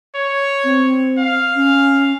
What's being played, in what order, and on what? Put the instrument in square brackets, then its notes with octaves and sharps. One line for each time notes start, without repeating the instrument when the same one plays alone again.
[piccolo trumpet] C#5
[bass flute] C4
[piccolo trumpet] F5
[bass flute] C#4